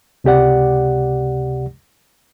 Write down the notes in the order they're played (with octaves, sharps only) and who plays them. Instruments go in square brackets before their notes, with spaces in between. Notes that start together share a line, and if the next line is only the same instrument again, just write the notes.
[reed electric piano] C#2 C3 G4 D5 F#5